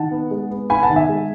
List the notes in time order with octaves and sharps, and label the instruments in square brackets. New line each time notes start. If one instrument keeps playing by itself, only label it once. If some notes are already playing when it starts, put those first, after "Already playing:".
Already playing: [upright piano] D#3 F#5 A5
B3
G#3
B3
B3 G#5 B5
F#5 A5
D#3
E5 G#5
G#3